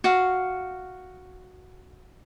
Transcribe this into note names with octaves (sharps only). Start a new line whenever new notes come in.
F#4 F5